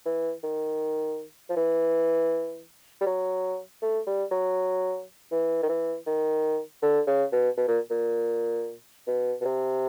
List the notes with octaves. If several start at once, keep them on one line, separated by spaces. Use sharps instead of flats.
E3
D#3
F3
E3
G3
F#3
A3
G3
F#3
E3
D#3
E3
D#3
D3
C#3
B2
B2
A#2
A#2
B2
B2
C3